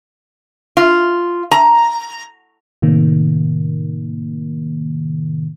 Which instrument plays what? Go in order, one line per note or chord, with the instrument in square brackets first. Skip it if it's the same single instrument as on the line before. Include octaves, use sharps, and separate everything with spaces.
[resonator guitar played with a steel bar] F4
A#5
[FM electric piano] A2 C3 D#3 A#3